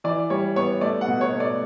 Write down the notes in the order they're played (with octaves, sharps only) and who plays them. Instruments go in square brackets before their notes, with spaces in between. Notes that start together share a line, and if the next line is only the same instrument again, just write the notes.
[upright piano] E3 D5
G3 C#5
B3 C#5
A3 D5
F#5
B2
C#5
A3
D5